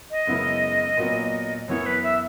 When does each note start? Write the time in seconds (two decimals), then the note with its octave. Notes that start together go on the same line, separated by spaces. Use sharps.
0.11 D#5
0.27 F#2 C#3 G#3 B3 E4
0.97 A#2 F#3 B3
1.67 F#2 E3 B3 E4 C#5
1.85 B4
2.03 E5